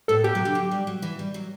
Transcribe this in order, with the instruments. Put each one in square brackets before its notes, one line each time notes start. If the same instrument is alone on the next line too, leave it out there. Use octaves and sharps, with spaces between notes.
[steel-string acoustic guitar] A2 [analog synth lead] A4
[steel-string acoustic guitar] B2 [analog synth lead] G4
[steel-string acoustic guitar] F#3
D3
F#3
G3
F#3
E3
G3
F#3